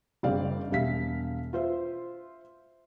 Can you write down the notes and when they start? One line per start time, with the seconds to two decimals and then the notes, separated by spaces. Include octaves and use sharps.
0.23 F#1 G2 C4 G#4 D5 F5
0.71 E1 G3 E5 F5 B6
1.53 F4 C5 E5